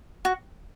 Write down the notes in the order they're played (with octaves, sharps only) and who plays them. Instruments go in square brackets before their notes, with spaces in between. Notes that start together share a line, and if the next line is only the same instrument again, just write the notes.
[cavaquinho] F#4